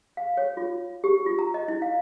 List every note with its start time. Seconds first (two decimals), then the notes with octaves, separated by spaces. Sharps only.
0.17 F5
0.37 C#5
0.57 F4
1.04 G4
1.26 F4
1.39 A#5
1.54 D#5
1.68 E4
1.82 F5